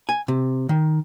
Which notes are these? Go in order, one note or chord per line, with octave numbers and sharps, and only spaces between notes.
G#5
C3
D#3